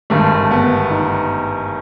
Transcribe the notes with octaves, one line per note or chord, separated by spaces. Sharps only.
G#1 G2 D3 A3
B3
D#4